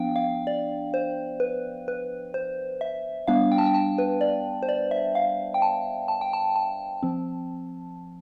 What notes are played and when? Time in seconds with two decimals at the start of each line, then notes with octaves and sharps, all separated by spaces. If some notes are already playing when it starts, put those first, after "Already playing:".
Already playing: F3 B3 D4 F5 G5
0.16 F5
0.47 D5
0.94 C5
1.40 B4
1.88 B4
2.34 C5
2.81 E5
3.27 G3 B3 D4 F5
3.52 G5
3.58 A5
3.66 G5
3.74 A5
3.98 B4
4.21 D5
4.63 C5
4.69 D5
4.91 E5
5.15 F5
5.54 G5
5.62 A5
6.08 A5
6.21 G5
6.33 A5
6.56 A5
7.03 F3 C4